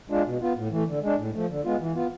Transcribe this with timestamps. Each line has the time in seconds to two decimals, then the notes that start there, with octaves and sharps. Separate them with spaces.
0.10 G#3 D4 F4
0.25 B2
0.41 B3 F4
0.56 A2
0.71 E3 A3
0.87 D3
1.03 G#3 D4
1.18 A2
1.33 F3 A3
1.49 D3
1.65 G#3 B3 F4
1.80 E3
1.95 B3 F4